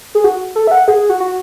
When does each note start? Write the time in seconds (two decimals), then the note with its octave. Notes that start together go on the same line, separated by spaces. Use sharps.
0.15 G#4
0.24 F#4
0.55 A4
0.67 E5
0.71 F#5
0.88 G#4
1.09 F#4
1.20 F#4